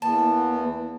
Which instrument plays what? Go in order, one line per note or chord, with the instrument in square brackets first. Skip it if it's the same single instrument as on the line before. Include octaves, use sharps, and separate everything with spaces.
[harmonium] E2 E3 B3 [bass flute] A#3 [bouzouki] A5